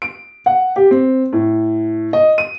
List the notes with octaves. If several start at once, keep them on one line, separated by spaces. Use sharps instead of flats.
D7
F#5
G4
C4
A2
D#5
D#7